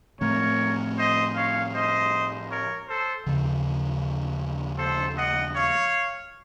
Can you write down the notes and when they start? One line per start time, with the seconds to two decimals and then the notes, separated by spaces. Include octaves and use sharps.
0.21 A2 F3 A3 C4 A#4 C#5
0.97 C5 D#5
1.35 C#5 F5
1.74 C5 D#5
2.50 A#4 C#5
2.88 A4 C5
3.27 D#2 C#3 F3
4.78 A4 C5
5.16 D#5 F#5
5.54 C#5 F5